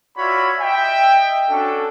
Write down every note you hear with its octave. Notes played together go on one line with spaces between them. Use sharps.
F4 F#4 C#5 D5 E5 B5
D#5 E5 G5
C#4 D4 F#4 A4